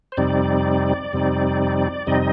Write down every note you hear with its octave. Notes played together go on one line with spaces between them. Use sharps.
C5
F2 C3 G3 C4 D#4 D5
F2 C3 G3 C4 D#4
F2 C3 G3 C4 D#4 D#5